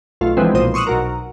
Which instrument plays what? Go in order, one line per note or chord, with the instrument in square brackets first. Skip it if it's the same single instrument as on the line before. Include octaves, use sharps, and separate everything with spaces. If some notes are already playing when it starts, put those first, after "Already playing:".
[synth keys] B1 A3 F4
D3 E3 F3 G#3 B3 C4
B1 A#2 C5 D#6
C6 C#6 D#6 E6 F#6
B1 F#4 A#4